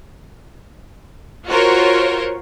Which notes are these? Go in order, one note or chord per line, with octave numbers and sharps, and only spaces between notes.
F4 F#4 A#4 C5 C#5